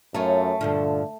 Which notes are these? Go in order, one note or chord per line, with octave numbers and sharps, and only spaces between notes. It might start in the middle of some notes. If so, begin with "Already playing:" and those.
F#2 A3 D#4 F4 C#5
G2 A#2 D3 F3